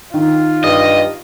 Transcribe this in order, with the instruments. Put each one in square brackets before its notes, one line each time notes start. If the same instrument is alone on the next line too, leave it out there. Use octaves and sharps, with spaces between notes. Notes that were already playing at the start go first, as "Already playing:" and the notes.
[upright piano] D#3 [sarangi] F4
[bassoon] G2 [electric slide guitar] D#5